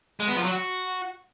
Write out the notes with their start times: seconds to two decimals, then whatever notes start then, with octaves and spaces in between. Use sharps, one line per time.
0.20 G#3
0.28 B3
0.36 F3
0.43 F#3
0.51 F#4